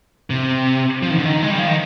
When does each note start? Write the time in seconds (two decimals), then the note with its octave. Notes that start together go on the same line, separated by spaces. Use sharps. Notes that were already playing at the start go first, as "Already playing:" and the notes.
0.30 C3
1.02 F3
1.11 D#3
1.18 D3
1.25 D#3
1.43 G#3
1.51 G3
1.59 F3
1.67 D#3